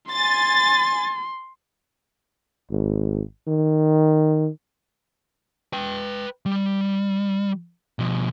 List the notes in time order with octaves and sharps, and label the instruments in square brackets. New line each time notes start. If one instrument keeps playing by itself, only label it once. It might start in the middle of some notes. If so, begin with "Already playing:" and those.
[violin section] G#5 A6 [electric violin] C6
[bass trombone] G#1
D#3
[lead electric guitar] B4 G5
G3
B2 F3